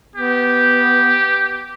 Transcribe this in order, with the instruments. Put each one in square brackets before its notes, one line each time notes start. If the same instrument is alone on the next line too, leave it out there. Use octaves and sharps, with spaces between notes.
[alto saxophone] B3 [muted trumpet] G4